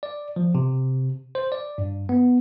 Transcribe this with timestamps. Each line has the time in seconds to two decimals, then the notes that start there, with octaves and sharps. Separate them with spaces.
0.03 D5
0.36 F3
0.55 C3
1.35 C5
1.52 D5
1.78 G2
2.09 B3